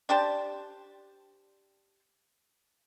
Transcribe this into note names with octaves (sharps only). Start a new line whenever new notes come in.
D4 G4 C5 A5